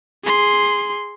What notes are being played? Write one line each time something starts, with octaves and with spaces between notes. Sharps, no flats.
G#4 C6